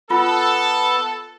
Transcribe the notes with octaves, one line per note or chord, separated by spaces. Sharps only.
B3 F4 A4 B4